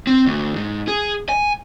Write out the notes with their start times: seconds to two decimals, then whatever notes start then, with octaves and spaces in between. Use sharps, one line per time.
0.07 C4
0.26 D2
0.56 G#2
0.88 G#4
1.29 G#5